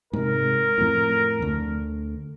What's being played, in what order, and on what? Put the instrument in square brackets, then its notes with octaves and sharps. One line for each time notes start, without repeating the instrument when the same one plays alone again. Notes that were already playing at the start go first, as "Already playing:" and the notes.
[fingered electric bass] G#2 C3 [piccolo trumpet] A#4
[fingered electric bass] F2 A2
D2